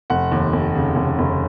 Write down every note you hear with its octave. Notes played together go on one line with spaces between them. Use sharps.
F1 F#5
D#2
F1
C#3
F1
F1